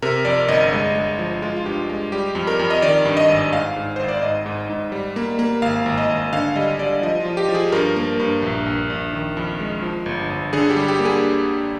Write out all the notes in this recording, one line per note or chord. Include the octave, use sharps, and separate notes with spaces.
C3 A#4
F2 D5
G1 D#5
G#3
G#3
F3
G#3 F4
F4
G2 G4
G#3
G3 G4
F2
A#4
F2
D#5
D#3 D5
G2
D#5
G#1
G#2 F5
G#2
G#1 C5
D5
G#2 D#5
G#2
G#2
G3
A#3
A#3
G#1 F5
G#1
D#5
G#1
D3 F5
G3 D#5
G3 D5
F3 D#5
F4
F3
G4
F3
G#4
G2 A#4
A#3
G2
A#1
A#1
A#1
D#3
F2
G#3
F3
G1
G1
D3 G#4
G4
G3
G4
A#3
G#4